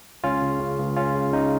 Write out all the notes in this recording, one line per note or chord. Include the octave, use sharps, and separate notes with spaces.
C#2 C#4 F4
C#3
C#3
C#2
C#3 C#4 F4
C#3
C#3 D#4